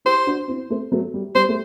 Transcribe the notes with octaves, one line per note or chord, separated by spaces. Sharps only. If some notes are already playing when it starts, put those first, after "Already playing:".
E4 G4 C5
D4 F#4
C4 E4
A3 C4
F#3 A3
G3
G3 C5
A3